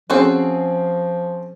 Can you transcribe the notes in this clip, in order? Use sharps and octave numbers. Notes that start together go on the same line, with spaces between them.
F3 C4 C#4 F#4 G#4 A4 C5